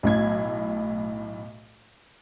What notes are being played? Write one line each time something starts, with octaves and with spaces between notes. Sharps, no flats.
B1 A2 G#6